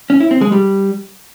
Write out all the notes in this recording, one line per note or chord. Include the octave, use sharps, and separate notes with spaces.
C#4
E4
C4
G#3
G3